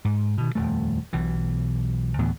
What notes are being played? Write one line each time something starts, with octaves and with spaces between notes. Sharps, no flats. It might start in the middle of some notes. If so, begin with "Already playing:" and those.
G#2
B2 D#3
D#1 F2 A3
B1 B2 E3
D2 A2 E3 B3